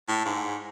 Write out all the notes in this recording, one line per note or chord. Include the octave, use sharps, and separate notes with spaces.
A2
G#2